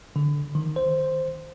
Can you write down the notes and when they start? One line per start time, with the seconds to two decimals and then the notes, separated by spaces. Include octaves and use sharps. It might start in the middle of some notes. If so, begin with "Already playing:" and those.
0.16 D3
0.55 D#3
0.76 C5